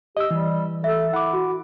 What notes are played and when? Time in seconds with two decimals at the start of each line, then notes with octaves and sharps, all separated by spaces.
0.17 G4 D#5 E6
0.31 E3 G3
0.84 A4 E5
1.13 E4 F#5 D6
1.33 F#4